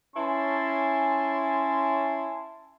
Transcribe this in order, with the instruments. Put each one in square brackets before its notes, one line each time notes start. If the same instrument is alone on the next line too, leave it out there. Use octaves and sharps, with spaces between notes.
[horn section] C#4 E4 G#5 A5 C6